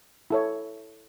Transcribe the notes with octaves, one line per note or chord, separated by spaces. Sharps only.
E4 A4 C#5